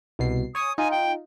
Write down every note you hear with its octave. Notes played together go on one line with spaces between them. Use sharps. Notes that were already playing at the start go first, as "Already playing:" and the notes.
C2 B2 C7
C#5 G#5 C#6 D#6
D#4 F4 G#5
G5